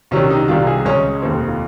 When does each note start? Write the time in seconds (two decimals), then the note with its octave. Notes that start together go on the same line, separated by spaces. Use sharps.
0.11 C2 C3 D#3 C#4
0.30 D#4
0.48 C2 C3 D#3 G3 F4
0.67 G#4
0.85 C#2 C#3 G#3 C#4
1.22 F1 D#2 D#3 C4
1.48 F4